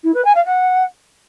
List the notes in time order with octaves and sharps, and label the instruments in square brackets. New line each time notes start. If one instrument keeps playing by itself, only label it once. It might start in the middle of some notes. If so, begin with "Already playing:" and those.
[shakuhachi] E4
B4
G#5
F5
F#5